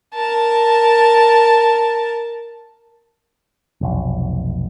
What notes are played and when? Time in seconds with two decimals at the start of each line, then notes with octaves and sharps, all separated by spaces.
0.15 A#4 A5
3.81 F1 B1